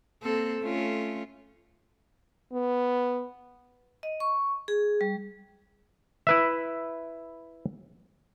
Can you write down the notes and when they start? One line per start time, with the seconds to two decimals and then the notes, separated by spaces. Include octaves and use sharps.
0.23 A#3 C4 A4
0.61 A3 C#4 F4
2.53 B3
4.03 D#5
4.20 C#6
4.68 G#4
5.01 G3
6.27 E4 B4 E5